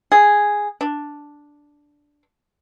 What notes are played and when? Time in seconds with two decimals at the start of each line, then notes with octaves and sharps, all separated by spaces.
0.12 G#4
0.81 D4